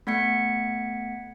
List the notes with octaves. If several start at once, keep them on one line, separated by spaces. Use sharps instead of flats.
A3 B3 F#5 G#6 B6 C#7